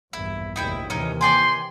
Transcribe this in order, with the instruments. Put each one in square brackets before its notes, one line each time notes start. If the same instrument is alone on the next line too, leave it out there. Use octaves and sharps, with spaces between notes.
[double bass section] A#1 E2 G2 [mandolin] E4
[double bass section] F1 A#1 D#2 [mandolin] D#4 E4 G5
[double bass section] D#2 C3 E3 [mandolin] C#4 D#4
[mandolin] D5 G5 G#5 [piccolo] C6